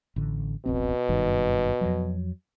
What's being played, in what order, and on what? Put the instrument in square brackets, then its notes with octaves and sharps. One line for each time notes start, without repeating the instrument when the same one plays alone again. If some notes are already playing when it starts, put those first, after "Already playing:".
[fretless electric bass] A1 D3
[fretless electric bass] D1 A1 C4 [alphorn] B2
[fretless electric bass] F#1 G2 D#3
F2 F3 F#3